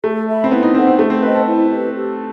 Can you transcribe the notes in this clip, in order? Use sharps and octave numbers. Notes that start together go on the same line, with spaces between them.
A3 A4
E5 B5
C4
B3 E4
D#4
C4 A4 C5 F#5
C4
A3 A4
C4
B4 C5 D#5 G5
A4
E4
G4 B4
G4